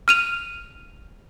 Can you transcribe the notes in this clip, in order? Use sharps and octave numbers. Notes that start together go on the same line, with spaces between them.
F6 D#7 F7